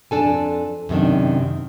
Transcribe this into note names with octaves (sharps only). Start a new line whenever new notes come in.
F2 D4 A4 G#5
F#2 C3 D#3 D4